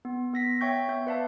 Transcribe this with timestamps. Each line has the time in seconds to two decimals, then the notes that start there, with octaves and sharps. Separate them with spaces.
0.05 B3
0.33 B3 A#6 B6
0.61 C#5 E5 G5 C#6 G6
0.89 B3 E5 G6
1.07 B4 D5 E5 F5 A5